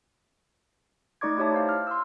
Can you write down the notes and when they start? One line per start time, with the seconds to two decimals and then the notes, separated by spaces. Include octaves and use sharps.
1.21 A3 D#4 D5 C#6 D6 G#6
1.37 D#4 E4 G4 C#5 E5 A5
1.52 E4 C5 F5
1.69 F6
1.87 C6 E6